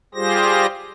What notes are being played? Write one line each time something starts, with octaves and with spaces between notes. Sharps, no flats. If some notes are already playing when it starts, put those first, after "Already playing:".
G3 F4 G4 G#4 C5 A#6